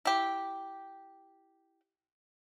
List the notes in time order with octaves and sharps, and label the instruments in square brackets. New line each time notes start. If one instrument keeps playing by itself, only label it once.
[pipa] E4 G4